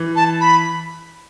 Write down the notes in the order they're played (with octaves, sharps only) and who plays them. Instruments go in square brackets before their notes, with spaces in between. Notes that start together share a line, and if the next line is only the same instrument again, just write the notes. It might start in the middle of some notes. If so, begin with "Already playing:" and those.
Already playing: [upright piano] E3
[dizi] A5
B5